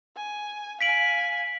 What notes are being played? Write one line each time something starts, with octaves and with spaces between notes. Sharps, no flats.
G#5
F5 G#5 B6 D7 F#7